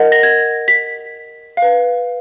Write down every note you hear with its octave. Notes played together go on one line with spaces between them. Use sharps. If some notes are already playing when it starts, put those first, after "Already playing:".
Already playing: A#4 D#5 F#5
A#6
G#6
B6
B4 F5